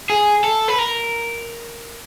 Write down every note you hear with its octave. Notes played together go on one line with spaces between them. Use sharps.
G#4
A4
B4
A#4